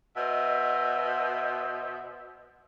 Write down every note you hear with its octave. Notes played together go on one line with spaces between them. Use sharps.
B2 C5 D#5 E5